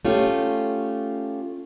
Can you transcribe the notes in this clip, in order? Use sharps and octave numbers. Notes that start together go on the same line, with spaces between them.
A3 C#4 F4 G4